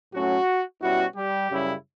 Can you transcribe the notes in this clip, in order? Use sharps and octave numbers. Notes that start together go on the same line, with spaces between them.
A2 F#3 A3 C#4 F#4
B2 G3 C#4 E4 F#4
G3 G4
F#2 C#3 G3 C#4 E4